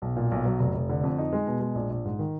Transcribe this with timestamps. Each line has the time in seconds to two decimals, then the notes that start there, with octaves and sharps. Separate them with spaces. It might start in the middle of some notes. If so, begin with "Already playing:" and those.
0.02 B1
0.16 A#2
0.31 B1
0.45 F#3
0.60 F1
0.75 F1
0.89 D3
1.04 F2
1.18 D#4
1.33 G#3
1.47 B2
1.61 G#3
1.75 A#1
1.90 A#1
2.05 G#2
2.19 D#3